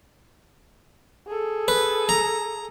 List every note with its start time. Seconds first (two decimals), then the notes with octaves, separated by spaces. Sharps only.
1.27 G#4 A4
1.68 B4
2.09 A#5